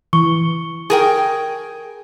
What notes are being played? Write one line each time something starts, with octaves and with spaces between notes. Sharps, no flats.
E3 C#6
G#4 A#4 G5